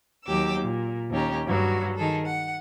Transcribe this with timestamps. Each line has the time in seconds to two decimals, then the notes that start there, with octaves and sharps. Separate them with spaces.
0.25 D#2 F#3 G4 D6 E6
0.59 A#2
1.10 D#2 C#4 G4 A#5
1.47 G2 F#3 F#4
1.96 D#3 G#4 A4
2.26 F#5